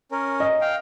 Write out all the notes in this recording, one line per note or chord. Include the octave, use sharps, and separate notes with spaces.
C#4 A#4
D#5
F5 G5